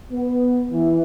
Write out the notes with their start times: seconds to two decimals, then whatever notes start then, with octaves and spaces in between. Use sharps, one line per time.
0.12 B3
0.72 E3